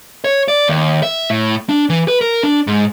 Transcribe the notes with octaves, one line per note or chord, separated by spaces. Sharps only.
C#5
D5
D#2
E5
A2
D4
E3
B4
A#4
D4
G#2